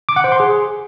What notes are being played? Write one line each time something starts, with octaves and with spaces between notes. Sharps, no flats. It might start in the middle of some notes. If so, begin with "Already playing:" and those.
D6
F#5
C5
C6
G#4